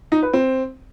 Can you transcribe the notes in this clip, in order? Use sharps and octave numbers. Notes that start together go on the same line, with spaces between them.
D#4
B4
C4